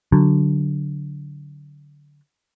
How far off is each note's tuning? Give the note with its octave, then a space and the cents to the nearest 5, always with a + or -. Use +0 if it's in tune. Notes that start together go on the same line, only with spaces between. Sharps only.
D3 -10 F#3 +0